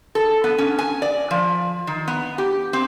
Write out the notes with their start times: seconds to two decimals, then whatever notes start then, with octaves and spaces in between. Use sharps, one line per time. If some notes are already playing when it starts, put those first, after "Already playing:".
0.15 A4
0.44 B3
0.58 C#4
0.79 G#5
1.02 D5
1.31 F3
1.87 D#3
2.08 B3
2.38 G4
2.73 C4